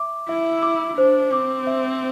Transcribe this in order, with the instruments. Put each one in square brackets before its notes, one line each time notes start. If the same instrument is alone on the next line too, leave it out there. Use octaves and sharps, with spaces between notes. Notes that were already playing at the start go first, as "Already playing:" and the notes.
Already playing: [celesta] E5 D6
[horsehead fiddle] E4 [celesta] E5
[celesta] D6
[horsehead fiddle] D4 [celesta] C5
[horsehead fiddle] C4 [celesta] D6
[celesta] E5